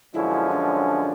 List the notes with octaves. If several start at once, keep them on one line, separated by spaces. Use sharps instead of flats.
F#2 D3 F3 G#3 C#4 E4
D4